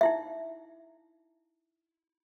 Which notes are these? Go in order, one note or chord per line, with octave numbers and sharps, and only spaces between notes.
D#4 E4 E5